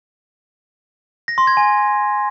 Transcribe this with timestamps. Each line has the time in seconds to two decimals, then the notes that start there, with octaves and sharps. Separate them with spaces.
1.28 A#6
1.38 C6
1.47 G#6
1.57 G#5